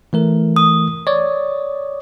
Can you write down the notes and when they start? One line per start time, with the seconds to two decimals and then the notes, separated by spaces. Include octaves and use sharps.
0.13 E3 A3 A#4
0.56 D#6
1.07 C#5 D5